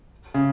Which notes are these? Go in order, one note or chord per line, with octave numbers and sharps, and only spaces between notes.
C#3